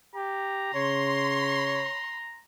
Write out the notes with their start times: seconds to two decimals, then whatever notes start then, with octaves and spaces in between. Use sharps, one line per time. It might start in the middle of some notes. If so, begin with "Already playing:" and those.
0.15 G4 A#5
0.75 C#3 C#5 C6